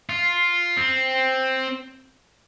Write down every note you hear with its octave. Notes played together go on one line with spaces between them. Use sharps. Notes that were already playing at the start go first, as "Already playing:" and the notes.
F4
C4